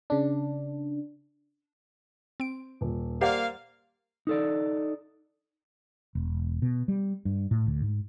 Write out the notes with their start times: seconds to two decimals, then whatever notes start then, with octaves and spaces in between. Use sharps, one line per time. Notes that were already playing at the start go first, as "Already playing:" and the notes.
0.10 C#3 D4
2.40 C4 D7
2.81 D#1
3.21 A#3 G4 C5 D5 F5 F#5
4.27 D#4 A4 D5
6.15 E1
6.62 B2
6.88 G3
7.25 G2
7.51 A2
7.67 D2
7.82 G#2